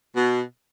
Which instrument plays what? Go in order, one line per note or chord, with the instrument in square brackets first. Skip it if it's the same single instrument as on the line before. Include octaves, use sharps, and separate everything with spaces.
[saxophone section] B2